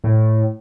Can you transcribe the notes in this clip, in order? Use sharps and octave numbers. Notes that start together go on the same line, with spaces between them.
A2